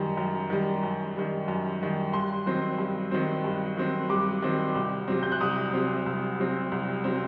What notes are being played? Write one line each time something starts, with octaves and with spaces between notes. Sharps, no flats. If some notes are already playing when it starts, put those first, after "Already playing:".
Already playing: F#2 D#3 G3 A#5
F#2
D#3 G3
F#2
D#3 G3
F#2
D#3 G3
G2 C6
D#3 F#3 C4
G2
D#3 F#3 C4
G2
D#3 F#3 C4
G2 D6
D#3 F#3 C4
C2
C3 F#3 C4
G6
F#6
C2 D#6
C3 F#3 C4
C2
C3 F#3 C4
C2
C3 F#3 C4